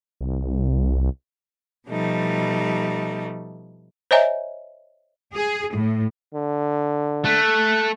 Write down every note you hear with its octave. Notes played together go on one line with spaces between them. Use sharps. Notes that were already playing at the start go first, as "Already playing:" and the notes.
C2
B2 F3 G3 A3 D#4
C5 C#5 D#5 E5 G#5 A#5
G#4
A2
D3
A3 F#6